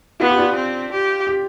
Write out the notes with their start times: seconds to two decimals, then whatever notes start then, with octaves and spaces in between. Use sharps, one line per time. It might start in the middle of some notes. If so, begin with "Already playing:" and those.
0.20 B3 F4
0.29 G4
0.37 D4 F4
0.55 C4
0.92 G4
1.27 G4